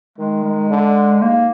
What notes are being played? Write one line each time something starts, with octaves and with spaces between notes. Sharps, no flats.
D#3 G#3
G#3
D3
G#2 A#3